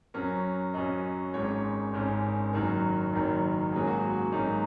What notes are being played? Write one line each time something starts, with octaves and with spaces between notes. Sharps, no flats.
F#2 F#3 C#4 A#4
F#2 F#3 C#4 D#5
G#1 G#2 G#3 C#4 C#5
G#1 G#2 G#3 C#4
F#1 F#2 D#3 F#3 A#4
F#1 F#2 D#3 F#3
G#2 F#3 A#3 C#4 G#4
F#4
F#4
G#2 F#3 A#3 C#4 D#4